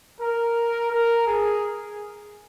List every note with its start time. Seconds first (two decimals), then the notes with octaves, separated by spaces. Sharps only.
0.20 A#4
0.92 A#4
1.27 G#4